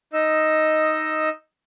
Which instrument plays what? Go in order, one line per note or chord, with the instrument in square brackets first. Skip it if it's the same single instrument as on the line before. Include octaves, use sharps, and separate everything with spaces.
[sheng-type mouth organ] D#4 D#5 E6